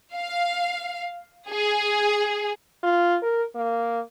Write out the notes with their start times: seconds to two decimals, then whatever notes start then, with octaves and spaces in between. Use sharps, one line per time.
0.14 F5
1.50 G#4
2.83 F4
3.22 A#4
3.55 A#3